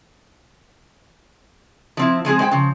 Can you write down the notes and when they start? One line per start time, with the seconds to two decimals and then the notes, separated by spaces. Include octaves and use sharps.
1.97 F3 C4 E4
2.25 F3 G#3 C4 G#4
2.39 G#3 C5 F#5 G5
2.52 C#3 F3